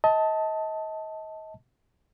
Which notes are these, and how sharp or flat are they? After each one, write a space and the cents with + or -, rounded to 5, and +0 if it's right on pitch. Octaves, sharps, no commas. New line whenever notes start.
D#5 +30 A5 +0